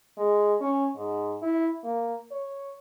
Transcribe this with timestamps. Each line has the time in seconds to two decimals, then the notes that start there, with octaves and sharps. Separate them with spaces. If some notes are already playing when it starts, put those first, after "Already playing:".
0.17 G#3
0.61 C#4
0.96 G#2
1.42 E4
1.84 A#3
2.31 C#5